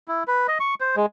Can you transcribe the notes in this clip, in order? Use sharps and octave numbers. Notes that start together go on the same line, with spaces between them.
E4
B4
D#5
C#6
C5
G#3